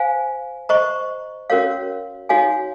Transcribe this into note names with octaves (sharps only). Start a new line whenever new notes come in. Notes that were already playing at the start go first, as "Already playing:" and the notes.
Already playing: C5 F5 G#5
C5 D#5 A#5 C#6
C#4 F#4 A#4 C#5 F5
D#4 F#4 C#5 F5 G#5